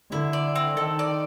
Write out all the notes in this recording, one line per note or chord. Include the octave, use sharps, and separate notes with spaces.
D3 E4
D5
C4
D#3 A4
D5